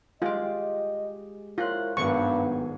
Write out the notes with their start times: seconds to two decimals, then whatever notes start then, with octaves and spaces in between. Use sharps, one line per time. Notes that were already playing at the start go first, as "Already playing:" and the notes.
0.22 G#3 F4 G4 D#5
1.58 E4 F4 A#4 C5 C#5 F#6
1.97 D#1 G#1 G2 F#3 B3 C#6